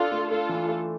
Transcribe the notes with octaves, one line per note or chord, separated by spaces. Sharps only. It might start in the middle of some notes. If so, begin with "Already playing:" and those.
Already playing: D4 F4 A4
A3
A3 F4 A4
E3
A3